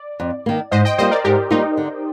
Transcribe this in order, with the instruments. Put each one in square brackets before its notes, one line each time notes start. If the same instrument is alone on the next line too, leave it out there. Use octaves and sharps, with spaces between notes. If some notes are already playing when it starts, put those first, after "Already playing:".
Already playing: [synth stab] D5
[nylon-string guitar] F2
D#3 A#3
[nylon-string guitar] G#2 [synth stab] C5 D#5
[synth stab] D#5 G5
[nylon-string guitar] G3 A#3 F4 [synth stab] C5 D#5
[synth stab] A#4 D5
[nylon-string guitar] G#2 [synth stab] G4 A#4
[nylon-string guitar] G3 A#3 F4 [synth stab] D#4
[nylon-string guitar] D3